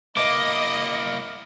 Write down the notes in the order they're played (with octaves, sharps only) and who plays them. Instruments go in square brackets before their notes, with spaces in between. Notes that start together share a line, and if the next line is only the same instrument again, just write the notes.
[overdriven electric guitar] A#3 E4 [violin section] D#5 [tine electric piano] D6